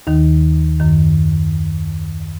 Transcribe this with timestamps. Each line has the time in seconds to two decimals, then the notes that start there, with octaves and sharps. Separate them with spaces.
0.07 D#2 D#3 D#4
0.80 F#2 D#3